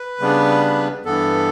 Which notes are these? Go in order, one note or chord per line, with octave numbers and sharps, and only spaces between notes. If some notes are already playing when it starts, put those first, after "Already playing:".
Already playing: B4
C#3 G3 B3 D4
G2 E3 B3 A4